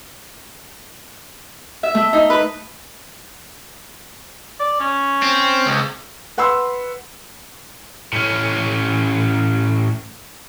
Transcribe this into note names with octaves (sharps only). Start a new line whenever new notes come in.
E5
A3
D#4
B4
D5
C#4
C4
C#2
B4 F#5 B5 C6 E6
A2 C#4